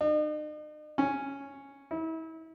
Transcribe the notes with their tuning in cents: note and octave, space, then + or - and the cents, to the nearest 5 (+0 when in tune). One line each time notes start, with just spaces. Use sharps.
D#4 -45
C#4 +0
E4 -35